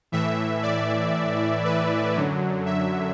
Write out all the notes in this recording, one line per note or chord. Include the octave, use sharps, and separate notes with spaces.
A2 E3 E5
D5
B4
F#2 D3 F#3
E5